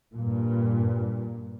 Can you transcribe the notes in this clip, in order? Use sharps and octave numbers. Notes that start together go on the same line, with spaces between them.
G2 A#2